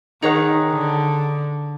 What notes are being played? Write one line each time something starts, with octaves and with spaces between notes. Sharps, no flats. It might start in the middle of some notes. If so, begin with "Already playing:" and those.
D#3 D#4 G#4 C#5 F#5
D3